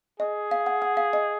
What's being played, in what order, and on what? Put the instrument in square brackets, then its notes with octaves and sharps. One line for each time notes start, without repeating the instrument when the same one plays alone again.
[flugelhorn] G#4 [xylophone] D#5
[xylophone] F5
F#5
F#5
F5
D#5